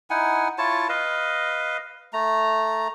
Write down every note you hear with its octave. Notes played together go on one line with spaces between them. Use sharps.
D#4 E4 F#5 G#5
E4 F4 C#5 A5
B4 D#5 F5
A3 A#5